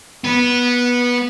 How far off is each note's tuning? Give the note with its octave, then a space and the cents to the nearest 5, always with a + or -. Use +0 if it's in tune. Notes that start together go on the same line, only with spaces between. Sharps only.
B3 -15